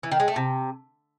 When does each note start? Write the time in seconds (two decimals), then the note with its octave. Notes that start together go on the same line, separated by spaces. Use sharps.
0.03 E3
0.11 D#3
0.20 G#3
0.28 A3
0.36 C3